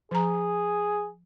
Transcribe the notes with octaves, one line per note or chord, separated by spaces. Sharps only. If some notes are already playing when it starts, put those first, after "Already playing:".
F3 G#4 A#5